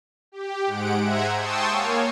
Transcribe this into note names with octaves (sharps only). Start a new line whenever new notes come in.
G4
G#2 G#3 F#5 D7
C5 E5 F#5 G#5 A#5 G#6
G5 A5 C6 C#6 D#6 E6
A#3 C#5 F5 G#5